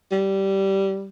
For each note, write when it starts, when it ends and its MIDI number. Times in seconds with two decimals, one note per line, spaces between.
0.11 1.09 55